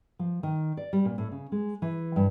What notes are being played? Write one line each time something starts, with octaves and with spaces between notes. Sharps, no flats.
F3
D#3
D5
G3
A#2
A2
C#3
G#3
E3
G2